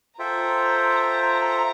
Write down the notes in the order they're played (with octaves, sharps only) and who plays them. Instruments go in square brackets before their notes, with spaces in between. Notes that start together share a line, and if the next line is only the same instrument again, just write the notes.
[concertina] F4 A4 C5 E5 G5 [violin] A#5
[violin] A#5